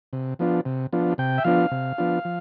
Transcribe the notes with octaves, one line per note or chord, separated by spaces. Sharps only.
C3
F3 B3 D4 F4
C3
F3 B3 D4 F4
C3 G5
E5
F3 B3 D4 F4 F5
C3
F3 B3 D4 F4
F3